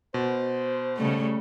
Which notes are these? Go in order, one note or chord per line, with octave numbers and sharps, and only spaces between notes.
B2 C5
C#3 G3 A3